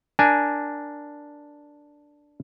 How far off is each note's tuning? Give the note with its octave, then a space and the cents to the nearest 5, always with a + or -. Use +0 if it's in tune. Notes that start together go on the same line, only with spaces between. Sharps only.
D4 +0 A#4 +0 G#5 +0